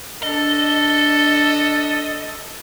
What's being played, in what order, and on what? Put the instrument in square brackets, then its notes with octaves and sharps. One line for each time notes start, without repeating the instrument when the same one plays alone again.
[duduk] D4 [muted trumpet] A4 [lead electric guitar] D#5